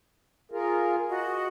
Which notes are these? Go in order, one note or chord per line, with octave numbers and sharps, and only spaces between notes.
F4 G#4 A#4
F#4 D#5